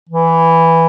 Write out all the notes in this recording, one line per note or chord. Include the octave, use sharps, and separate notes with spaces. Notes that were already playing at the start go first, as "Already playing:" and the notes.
E3